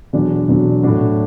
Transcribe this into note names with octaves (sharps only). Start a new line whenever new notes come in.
E1 E2 D3 F#3 D4
E1 E2 D3 F#3 D4
A2 F#3 D4 F#4